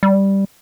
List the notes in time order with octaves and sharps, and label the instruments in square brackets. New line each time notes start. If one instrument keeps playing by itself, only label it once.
[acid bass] G3